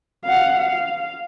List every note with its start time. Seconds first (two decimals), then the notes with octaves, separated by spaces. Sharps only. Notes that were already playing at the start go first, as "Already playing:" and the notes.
0.24 F5 F#5
0.58 F5